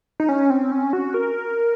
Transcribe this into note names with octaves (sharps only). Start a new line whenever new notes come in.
D#4
C#4
C4
C#4
F#4
A#4